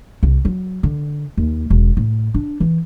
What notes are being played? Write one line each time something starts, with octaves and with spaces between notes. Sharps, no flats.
C2
F#3
D3
D#2
E1
A2
D4
E3